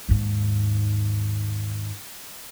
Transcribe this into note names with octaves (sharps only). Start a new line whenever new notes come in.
D#2 G#2